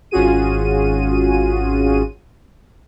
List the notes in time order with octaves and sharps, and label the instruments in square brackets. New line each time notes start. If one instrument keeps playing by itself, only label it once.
[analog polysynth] G#1 C#4 F4 F#4 G#4 D#7